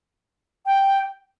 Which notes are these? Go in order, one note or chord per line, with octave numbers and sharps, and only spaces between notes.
G5